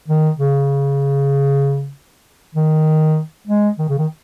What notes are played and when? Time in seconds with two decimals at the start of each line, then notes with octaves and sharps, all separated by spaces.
0.08 D#3
0.39 C#3
2.55 D#3
3.48 G#3
3.79 D#3
3.89 C#3
3.98 D#3